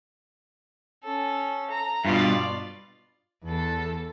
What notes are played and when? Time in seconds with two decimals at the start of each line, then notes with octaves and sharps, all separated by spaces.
1.04 C#4 A4
1.71 A#5
2.05 G2 B2 F4 D5
3.44 E2 A4